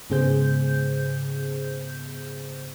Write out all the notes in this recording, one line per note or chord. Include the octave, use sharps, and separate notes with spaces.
G#2 C#3 B3 G#4 C5 G6